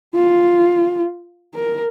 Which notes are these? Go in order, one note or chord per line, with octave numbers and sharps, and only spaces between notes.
F4
A#4